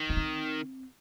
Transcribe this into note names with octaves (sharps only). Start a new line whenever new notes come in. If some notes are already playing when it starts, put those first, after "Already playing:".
Already playing: D#3
C#4
C4